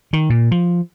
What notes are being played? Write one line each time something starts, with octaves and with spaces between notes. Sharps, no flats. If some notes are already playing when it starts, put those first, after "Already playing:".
D#3
A#2
F3